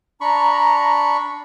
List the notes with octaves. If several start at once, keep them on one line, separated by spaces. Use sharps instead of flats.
D4 A#5 B5 C#6